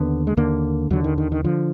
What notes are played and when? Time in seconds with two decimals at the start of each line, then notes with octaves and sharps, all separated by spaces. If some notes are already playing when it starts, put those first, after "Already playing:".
Already playing: D#2 D3 B3
0.27 G#3
0.37 D#2 D3 A#3
0.90 D#2 D3 F#3
1.04 D#3
1.18 D#3
1.32 D#3
1.44 D3 F3